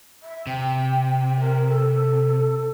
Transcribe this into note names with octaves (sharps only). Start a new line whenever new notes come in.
E5
C3 G5
A#4
A4